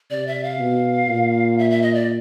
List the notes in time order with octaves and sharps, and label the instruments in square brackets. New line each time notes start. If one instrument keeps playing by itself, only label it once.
[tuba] C3 [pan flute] D5
[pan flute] E5
F5
[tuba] B2
A#2
[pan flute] E5
E5
D#5
D5